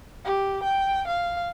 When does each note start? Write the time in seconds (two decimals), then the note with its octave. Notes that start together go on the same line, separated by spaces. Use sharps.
0.25 G4
0.63 G5
1.08 F5